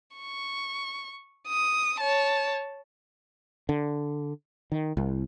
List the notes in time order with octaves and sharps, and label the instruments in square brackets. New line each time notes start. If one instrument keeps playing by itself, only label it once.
[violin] C#6
D#6
C#5 A5
[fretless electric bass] D3
D#3
C2